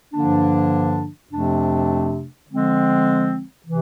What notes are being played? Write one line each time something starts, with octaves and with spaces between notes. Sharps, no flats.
G2 D3 F3 A#3 D4
F2 C3 F3 A3 D4
D3 F3 G#3 C4
C3 E3